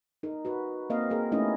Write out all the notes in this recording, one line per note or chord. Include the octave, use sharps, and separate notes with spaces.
D#4 A#4
F#4 B4
A#3 C4 A#4 D#5 F5
A#3 G#4 A#4
A3 B3 C#4 D#4 E4 D#5